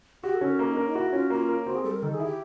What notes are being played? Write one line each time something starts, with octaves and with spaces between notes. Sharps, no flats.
F#4 G4
A4
C#4
A#4
A#3 A4
D#4
D4 A#4
D#4
E4 F#4
C#4 F4
A#3 F4
A#4
C4 F#4
G#4
G3 A4
A#4
D#3 A4
G#4
E4
G4